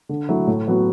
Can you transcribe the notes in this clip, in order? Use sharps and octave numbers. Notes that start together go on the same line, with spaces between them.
D3
F#3 A3 E4
A2
F#3 B3 F#4